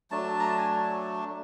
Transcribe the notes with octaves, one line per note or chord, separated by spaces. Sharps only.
F#3 A3 D4 A5
A#5
A5
G#5